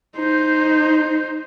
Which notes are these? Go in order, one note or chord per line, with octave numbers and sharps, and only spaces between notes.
D#4 C5